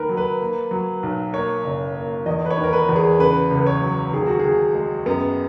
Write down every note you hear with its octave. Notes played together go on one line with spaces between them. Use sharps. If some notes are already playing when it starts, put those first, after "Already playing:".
Already playing: D#3 A#3 A#4 B4
F#3
B4
A#3
F#3
B1
A#3 C#5
F#1
A#3
E2 D#5
B4
C#5
D#3
A#4
B4
E2
G#4
C#3 B4
C#2
B4
C#5
F#3
D#2 G#4
F#4
D#2 G#4
G#3
F#2 B3